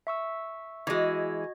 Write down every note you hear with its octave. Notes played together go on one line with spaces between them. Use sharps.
E5 C#6 E6
E3 G#3 F#4 D#5 G#6